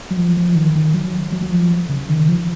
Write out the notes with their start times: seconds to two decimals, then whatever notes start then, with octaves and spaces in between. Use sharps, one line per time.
0.11 F#3
0.17 F3
0.37 F3
0.55 D#3
0.75 D#3
0.94 F#3
1.32 F#3
1.42 F#3
1.51 F3
1.89 C#3
2.09 D#3
2.29 F3